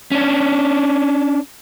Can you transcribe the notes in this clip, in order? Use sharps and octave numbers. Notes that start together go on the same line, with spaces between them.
C#4 D4